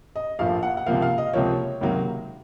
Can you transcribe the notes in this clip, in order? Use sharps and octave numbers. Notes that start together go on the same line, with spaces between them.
D#5
A#1 A2 F3 A#3 F5
F#5
F#5
C#2 C3 F3 A#3 F5
F5
D#5
C#2 C3 F3 A#3 C#5
C#2 C3 D#3 F#3 A#3